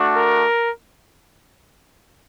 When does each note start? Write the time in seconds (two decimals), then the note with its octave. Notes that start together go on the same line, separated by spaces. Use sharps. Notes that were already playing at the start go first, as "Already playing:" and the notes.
Already playing: A3 D4 F#4
0.14 A#4